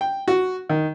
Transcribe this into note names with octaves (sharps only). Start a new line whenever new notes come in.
G5
F#4
D#3